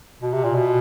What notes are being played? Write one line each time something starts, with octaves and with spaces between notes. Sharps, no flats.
B2
C3
A#2
B2